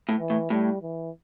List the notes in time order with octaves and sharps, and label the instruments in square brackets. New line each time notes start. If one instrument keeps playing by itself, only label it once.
[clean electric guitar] A2
[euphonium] E3
[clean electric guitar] A2
[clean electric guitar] A2 [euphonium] G3
[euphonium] E3